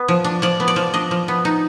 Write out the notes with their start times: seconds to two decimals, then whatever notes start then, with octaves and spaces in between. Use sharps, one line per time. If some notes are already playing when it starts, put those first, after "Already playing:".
Already playing: B3
0.08 F3
0.24 D4
0.42 F3 D5
0.60 B3
0.68 D5
0.76 F3
0.94 D4 D#5
1.11 F3
1.28 B3
1.45 D#4